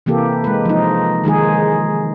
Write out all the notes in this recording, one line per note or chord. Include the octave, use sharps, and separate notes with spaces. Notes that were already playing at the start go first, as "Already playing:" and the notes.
C3 E3 A#3 G4 A4
G#3 B4
F3 D#4
D#3 G#3 D#4 G#4